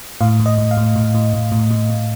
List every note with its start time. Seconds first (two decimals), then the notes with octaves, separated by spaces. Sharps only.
0.21 A2 F5
0.40 A2
0.46 D#5
0.58 A2
0.71 F5
0.77 A2
0.96 A2
1.15 A2
1.33 A2
1.52 A2
1.71 A2
1.90 A2